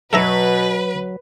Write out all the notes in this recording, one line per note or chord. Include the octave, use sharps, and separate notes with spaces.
B2 F#3 A4 B4 E5 A#5